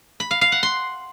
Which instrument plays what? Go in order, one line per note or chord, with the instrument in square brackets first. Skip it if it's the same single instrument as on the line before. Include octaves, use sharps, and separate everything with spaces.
[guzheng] B5
F5
F5
F#5
C6